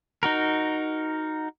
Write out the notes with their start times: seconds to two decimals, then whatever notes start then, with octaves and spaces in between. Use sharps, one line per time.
0.23 D#4 F#4 A#4